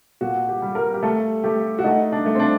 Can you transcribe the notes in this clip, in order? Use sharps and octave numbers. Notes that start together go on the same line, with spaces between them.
A#2 F#4
G4
G3
A#4
G4
A3 A4
A3 G4
F#4
A3 D#4
D4
A3
C4
D4